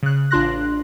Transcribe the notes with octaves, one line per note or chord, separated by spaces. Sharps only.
C#3 F#6
A1 D4 F4 C6 F#6 A#6